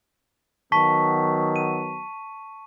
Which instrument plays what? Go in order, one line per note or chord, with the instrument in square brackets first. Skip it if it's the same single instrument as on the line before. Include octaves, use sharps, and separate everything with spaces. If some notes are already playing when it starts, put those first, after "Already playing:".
[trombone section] D#3 F#3 B3 [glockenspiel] A5 C#6 B6
[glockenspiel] D#7